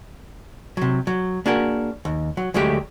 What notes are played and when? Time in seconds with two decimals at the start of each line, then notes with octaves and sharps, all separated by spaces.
0.77 C3 F#3
1.07 F#3
1.46 A#3 D4 F#4 G#4 A#4
2.05 D#2
2.37 F#3
2.54 D2 F#3 G#3 A3 G4